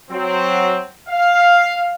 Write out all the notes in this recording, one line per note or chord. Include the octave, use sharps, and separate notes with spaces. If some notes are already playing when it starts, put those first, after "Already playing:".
F#3 C4
F5